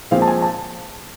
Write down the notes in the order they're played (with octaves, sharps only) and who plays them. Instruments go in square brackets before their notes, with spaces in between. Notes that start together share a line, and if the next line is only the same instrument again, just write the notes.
[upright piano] A#2 F3 G#3 C4 F5
A5
G#5
A5